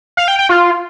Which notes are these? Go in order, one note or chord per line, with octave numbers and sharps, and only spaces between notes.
F5
G5
G5
F4